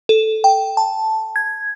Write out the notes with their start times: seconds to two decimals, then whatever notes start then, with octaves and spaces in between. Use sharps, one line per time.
0.09 A4
0.44 G5
0.77 A5
1.36 G#6